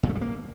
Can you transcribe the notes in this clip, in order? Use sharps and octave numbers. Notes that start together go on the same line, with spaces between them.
A#2
A3
G3
A#3